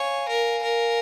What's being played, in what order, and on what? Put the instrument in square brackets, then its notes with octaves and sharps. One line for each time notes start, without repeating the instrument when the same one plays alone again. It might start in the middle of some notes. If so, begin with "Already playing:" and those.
Already playing: [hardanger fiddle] C#5 [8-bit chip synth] F5 G#5
[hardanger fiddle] A#4
A#4